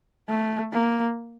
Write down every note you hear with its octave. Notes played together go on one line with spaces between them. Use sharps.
A3
A#3